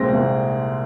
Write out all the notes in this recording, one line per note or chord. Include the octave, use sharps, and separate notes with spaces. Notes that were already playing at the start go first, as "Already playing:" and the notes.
Already playing: C2 A#2 G#3 C4 A#6
C2